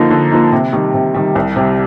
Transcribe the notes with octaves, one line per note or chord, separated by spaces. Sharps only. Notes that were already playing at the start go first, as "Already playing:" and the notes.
Already playing: D3 F3 A#3 D#4 A#4
D3
F3 A#3 D#4 A#4
C3
D#3 G3
C3
D#3 G3
C2
C3 G3